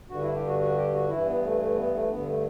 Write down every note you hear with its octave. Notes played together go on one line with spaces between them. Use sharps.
G2 D3 F#4
E4
G4
F#4
F#4
G4
F#4
G2 E3 E4
B3
A3
A3
B3
A3
G2 D3 B3
A3